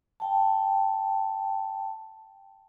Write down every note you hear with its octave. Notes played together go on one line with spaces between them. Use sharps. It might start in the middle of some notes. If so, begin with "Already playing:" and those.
G5 A5